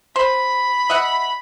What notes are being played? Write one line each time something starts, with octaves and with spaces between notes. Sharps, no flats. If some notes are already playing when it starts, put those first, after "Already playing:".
C5 B5
D#5 E5 F#5